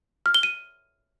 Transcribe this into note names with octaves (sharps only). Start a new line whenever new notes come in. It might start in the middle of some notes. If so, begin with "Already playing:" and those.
F6
G7
D#7